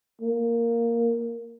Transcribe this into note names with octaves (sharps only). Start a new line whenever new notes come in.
A#3